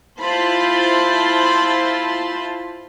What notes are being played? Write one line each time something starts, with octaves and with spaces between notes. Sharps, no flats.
E4 F4 C5 A5 B5 C6